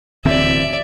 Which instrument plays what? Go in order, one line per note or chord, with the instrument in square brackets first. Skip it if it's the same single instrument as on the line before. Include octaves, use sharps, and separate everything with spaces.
[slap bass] D1 E3 C4 [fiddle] D5 E5